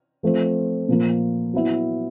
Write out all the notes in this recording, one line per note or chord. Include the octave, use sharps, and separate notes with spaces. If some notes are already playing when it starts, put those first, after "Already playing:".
F3 A3 C4
A#2 F3 A#3
F#3 B3 E4